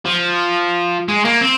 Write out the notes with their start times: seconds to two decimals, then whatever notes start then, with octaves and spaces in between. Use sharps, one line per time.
0.05 F3
1.08 G#3
1.25 A#3
1.41 C4